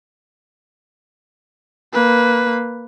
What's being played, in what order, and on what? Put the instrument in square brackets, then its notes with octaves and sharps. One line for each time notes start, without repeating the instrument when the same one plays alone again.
[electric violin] A#3 B4